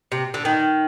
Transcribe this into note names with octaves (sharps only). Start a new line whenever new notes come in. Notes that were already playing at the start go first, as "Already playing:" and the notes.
C3
D3
D#3